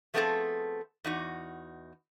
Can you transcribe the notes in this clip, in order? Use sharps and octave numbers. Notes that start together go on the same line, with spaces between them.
F3 A3 B3 C4 G#4 A4
E2 D#4 F#4